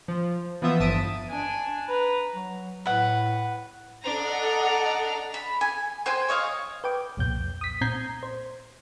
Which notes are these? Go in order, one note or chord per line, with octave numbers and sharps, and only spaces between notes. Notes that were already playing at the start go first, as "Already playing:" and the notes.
F3
E3 F3 B3 F4 E5 D#6
G1 E5 A5 D#6 D7 D#7
D4 G#5
B4 A#5
F#3
A2 B4 F#5
D4 A4 D#5 F#5 A#5
B5
G#5
C5 G5 G#5
C#5 D#5 F5 C#6
B4 G5 D6
C2 F2 A#2 G6
D#6 B6
A#2 C4 A#5 G6 G#6 C7
C5